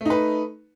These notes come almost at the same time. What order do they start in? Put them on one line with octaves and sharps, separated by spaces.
A3 D#4 B4